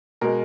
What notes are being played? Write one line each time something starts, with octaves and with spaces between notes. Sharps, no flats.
B2 G#3 A#4